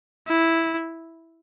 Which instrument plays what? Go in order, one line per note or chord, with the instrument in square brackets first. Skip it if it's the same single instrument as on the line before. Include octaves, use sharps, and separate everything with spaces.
[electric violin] E4